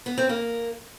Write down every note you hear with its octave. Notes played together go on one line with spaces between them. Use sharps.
B3
C4
A#3